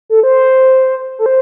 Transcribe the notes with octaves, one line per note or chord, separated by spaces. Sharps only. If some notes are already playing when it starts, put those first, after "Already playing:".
A4
C5
A4
C5